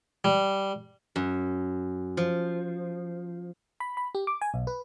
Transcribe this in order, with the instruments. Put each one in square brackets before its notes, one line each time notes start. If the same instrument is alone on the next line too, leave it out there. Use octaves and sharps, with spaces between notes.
[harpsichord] G3
[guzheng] F#2
F3
[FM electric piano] B5
B5
G4
D6
G#5
B1
B4